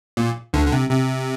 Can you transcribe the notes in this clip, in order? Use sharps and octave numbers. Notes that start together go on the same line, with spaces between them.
A#2
D2 D3
D3
C3
C3